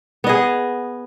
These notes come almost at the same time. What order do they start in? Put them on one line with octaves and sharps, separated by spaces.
B3 D#5 G#4